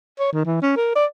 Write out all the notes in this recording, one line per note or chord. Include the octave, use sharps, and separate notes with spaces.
C#5
D#3
E3
C#4
A#4
D5